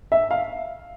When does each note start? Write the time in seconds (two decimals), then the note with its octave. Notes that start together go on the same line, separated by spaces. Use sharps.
0.12 E5
0.31 F5